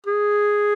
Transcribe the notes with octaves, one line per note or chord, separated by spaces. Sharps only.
G#4